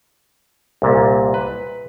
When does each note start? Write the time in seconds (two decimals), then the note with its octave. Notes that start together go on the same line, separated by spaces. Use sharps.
0.82 C2 A#2
1.34 B4